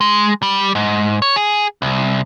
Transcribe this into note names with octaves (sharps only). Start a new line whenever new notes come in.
G#3
G3
G#2
C#5
G#4
C2